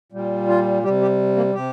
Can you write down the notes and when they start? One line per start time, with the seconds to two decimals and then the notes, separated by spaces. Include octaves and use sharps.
0.12 A#2 G3
0.48 F4
0.83 C3 G3 G4
1.02 G4
1.37 A#3
1.55 C3 G4